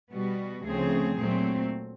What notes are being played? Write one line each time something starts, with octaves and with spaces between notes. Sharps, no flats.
B2 G3 B3 F#4
D2 C#3 F3 A3 C4 G#4
A#2 F#3 A3 C4